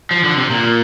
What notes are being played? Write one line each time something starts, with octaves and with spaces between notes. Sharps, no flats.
F3
D3
C3
A#2